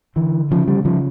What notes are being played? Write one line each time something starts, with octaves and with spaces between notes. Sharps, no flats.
D3 E3
C#3 F3
G3
C#3 F3